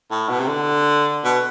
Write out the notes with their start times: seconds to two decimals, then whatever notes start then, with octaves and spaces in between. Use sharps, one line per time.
0.11 A2
0.29 B2
0.40 C3
0.48 D3
1.25 B2